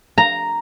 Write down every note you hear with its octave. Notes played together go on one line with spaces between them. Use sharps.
A#5